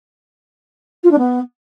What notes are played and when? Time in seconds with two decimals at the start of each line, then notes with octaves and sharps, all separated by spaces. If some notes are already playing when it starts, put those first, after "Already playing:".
1.04 F4
1.11 D4
1.18 B3